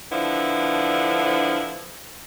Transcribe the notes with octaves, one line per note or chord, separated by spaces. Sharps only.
D3 F3 B3 D4 E4